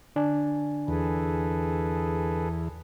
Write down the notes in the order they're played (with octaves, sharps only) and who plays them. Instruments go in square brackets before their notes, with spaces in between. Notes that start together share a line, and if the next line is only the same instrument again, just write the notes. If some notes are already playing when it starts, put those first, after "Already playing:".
[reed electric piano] D3 D4 G#5
[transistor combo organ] E2 [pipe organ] G#4 A4 B4